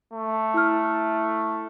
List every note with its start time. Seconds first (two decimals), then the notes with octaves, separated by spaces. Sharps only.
0.13 A3
0.54 E4 F6